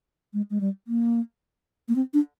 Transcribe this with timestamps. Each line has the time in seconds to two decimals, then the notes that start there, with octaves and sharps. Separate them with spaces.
0.34 G#3
0.50 G#3
0.61 G3
0.88 A#3
1.88 A#3
1.96 C4
2.14 D4